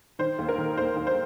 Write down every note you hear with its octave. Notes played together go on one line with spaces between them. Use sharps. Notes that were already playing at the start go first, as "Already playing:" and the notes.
D#3 C5
D#2
A#4
D#3
D#2 C5
D#2
C5